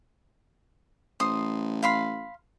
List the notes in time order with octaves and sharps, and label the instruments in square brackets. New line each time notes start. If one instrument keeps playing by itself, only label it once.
[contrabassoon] A1 [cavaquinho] C5 D#6
[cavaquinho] F5 B5 C6